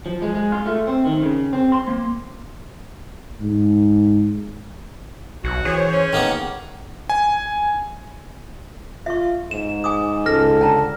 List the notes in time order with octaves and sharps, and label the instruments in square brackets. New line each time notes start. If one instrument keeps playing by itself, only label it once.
[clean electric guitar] F3
G#3
G#3
F4
A3
C4
D#3
C#3
C4
C6
A#3
[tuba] G#2
[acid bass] B1 [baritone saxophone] F#4
[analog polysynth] E3 C5 C#5 [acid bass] G#4
[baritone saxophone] C#4
[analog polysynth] A1 [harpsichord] D#3 A#3 B3
[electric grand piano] G#5
[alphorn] F4 [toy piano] E5 C#6
[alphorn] G#2 [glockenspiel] E7
[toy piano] G#5 D6 D#6
[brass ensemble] C#2 A4 [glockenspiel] F6 A#6
[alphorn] D3 [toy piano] G5 A5 A#5